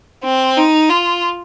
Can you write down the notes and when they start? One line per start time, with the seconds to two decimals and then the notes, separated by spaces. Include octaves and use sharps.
0.25 C4
0.57 D#4
0.89 F4